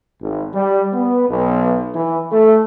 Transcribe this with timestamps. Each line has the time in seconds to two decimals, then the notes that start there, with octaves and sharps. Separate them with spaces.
0.22 G#1
0.54 G3
0.93 B3
1.29 B1
1.95 E3
2.32 A3